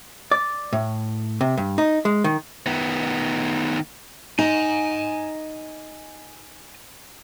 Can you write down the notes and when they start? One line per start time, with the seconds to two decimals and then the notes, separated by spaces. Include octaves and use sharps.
0.31 D5
0.73 A2
1.41 C3
1.57 G2
1.78 D#4
2.05 G#3
2.24 D#3
2.66 D#3 B3
4.39 D#4 D#5 G#5 A#5